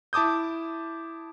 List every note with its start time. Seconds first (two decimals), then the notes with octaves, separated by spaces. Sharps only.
0.13 E4 A5 D6 D#6 G6